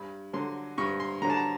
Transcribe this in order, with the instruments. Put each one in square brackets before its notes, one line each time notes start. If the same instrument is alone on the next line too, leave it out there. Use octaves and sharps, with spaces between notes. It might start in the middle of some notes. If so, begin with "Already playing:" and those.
Already playing: [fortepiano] G2 B5
D3 F#3 C6
G2 C#6
C6
D3 A#5
F#3
A5
A#5